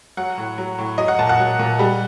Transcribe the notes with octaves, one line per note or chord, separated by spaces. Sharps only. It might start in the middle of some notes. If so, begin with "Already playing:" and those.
F#3 F#5
A2
F#3
A2
F#3 D#5
F#5
A#2 A5
F#5
F#3
A#2
G3